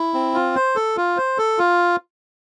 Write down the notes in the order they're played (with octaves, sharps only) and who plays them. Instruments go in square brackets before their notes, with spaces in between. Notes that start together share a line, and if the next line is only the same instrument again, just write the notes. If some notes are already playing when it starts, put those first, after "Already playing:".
Already playing: [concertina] E4
C4
F4
C5
A4
F4
C5
A4
F4